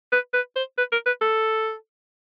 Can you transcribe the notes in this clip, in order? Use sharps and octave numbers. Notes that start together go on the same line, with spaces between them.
B4
B4
C5
B4
A#4
B4
A4